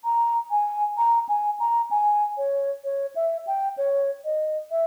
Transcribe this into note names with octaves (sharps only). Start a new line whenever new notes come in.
A#5
G#5
A#5
G#5
A#5
G#5
C#5
C#5
E5
G5
C#5
D#5
E5